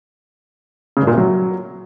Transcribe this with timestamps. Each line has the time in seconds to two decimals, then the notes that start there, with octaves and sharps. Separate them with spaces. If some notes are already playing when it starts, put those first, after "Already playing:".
0.97 C#3
1.02 G2
1.07 A#2
1.12 C3
1.17 F#3